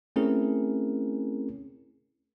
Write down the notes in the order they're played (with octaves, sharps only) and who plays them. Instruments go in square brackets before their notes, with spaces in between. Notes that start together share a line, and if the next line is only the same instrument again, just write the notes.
[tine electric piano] A3 C4 C#4 E4 G#4 A#4